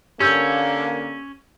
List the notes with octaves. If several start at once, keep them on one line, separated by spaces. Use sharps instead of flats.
D3 A#3 C#4 G4 E6 G6